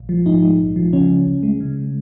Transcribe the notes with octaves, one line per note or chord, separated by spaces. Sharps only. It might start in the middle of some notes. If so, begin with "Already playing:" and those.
Already playing: A#1
F3
G#2 D#4
G#3
A#1
F3
C#3 C#4
C#2
C#2
G#3
C#3